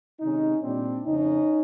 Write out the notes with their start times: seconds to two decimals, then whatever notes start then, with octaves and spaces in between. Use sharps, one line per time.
0.21 C3 D#3 G#3 C#4 D#4
0.63 A#2 G3 C4 D4
1.05 F2 C#3 F3 A3 C#4 D#4